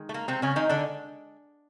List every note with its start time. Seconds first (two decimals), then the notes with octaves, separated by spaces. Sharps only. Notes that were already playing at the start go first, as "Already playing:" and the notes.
Already playing: D#3 G#3
0.09 A3
0.14 A#3
0.28 C3 C4
0.42 C#3 C#4
0.56 D#3 D#4
0.69 D3 D4